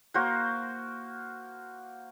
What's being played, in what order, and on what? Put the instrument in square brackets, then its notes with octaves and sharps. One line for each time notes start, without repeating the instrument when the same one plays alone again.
[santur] A#3 F#4 C5